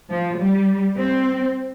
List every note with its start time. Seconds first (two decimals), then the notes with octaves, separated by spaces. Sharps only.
0.11 F3
0.39 G3
0.98 C4